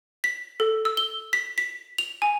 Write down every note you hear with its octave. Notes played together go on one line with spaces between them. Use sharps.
B6
A4
E6
G7
B6
B6
F7
G#5